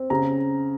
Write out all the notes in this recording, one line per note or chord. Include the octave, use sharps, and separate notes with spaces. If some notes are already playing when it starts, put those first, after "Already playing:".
Already playing: C4
C#3 A#5